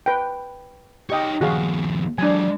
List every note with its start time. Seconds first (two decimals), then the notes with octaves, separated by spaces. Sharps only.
0.06 B4 G5
1.10 D#4 G4 C#5 D#5 G5
1.41 D#2 F3 F#4 G#4 F5
2.18 F#3 G#3 D4 G#5